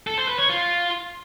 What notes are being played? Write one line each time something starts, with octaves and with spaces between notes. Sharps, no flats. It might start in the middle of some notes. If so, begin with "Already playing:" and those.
A4
C5
B4
C#5
F4